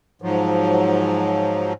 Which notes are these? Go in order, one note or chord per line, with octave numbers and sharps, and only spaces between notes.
G#2 F3 F#3